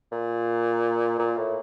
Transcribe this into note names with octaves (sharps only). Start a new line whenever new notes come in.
A#2
A#2
A2